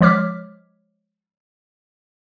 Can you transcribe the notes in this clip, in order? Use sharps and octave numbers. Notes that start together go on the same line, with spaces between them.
F3 G#3 C#5 D6 F6 B6